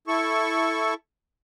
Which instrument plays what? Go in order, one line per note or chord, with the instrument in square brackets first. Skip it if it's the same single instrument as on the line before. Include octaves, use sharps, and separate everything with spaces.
[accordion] E4 A4 C#6